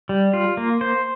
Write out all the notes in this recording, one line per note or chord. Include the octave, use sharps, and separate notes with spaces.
G3
F4
A#3
C5